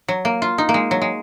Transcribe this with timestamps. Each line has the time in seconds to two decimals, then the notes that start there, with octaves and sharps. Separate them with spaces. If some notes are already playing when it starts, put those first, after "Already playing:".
0.08 F#3
0.25 A#3
0.42 F4
0.58 D#4
0.69 A#3
0.74 G#3
0.91 F#3
1.02 G#3